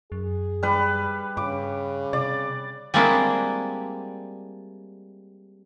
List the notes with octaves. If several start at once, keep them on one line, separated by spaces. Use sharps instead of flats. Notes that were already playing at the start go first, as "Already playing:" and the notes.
F#2 G#4
G3 B4
G2 C#3 D6
C3 D5
G3 G#3 A#3 C4 D4 E4